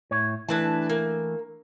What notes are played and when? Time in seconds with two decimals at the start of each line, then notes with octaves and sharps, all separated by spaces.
0.11 A2 C#5
0.49 E3 A3 D4 E4 B4 A5
0.90 A#3